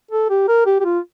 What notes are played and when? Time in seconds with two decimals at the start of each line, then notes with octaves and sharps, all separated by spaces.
0.11 A4
0.30 G4
0.48 A#4
0.66 G4
0.80 G4
0.85 F4